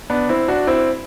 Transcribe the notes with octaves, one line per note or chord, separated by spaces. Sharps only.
B3 D4
C4 E4
D4 F#4
C4 E4